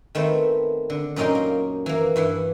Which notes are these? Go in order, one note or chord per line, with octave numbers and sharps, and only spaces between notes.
D#3 A3 B3 C4
D3
F#2 A#2 C#4 D#4 G5 C6
A#3
E3 A#3
G2 E3 F#5